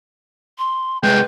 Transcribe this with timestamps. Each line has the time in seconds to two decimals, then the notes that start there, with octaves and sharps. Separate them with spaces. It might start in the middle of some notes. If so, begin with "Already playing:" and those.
0.58 C6
1.03 C2 G#3 B4 G5